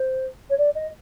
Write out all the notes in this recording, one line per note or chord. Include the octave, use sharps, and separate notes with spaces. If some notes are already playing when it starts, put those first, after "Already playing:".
Already playing: C5
C#5
D5
D#5